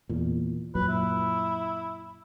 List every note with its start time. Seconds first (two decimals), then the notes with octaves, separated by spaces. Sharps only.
0.09 E2 A#2
0.75 F#2 A#2 F#3 B4
0.88 E4